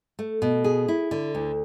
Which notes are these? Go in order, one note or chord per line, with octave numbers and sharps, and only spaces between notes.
A3
B2
G#4
E4
D3
D2